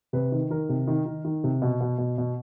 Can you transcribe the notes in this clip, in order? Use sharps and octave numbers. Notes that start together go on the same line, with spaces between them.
C3 B4
D#3
D#3 A#4
C3
D#3
D#3
D#3
C3
B2
B2
B2
B2